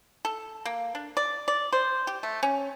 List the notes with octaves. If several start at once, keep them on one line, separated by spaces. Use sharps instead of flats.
A4
A#3
D4
D5
D5
C5
G4
A3
C#4